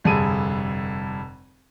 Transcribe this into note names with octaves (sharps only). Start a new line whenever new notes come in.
F1 G2 D3 G#4 D#7